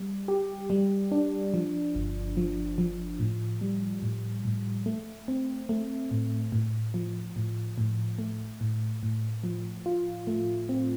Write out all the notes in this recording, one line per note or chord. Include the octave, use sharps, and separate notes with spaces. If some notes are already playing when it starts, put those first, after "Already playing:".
Already playing: G3
G4
G3
D4
F3
G1
F3
F3
A2
G3
A2
A2
A3
C4
A3
A2
A2
F3
A2
A2
A3
A2
A2
F3
F4
A3
C4